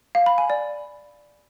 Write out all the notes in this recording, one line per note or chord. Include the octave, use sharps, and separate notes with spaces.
F5
B5
G#5
D5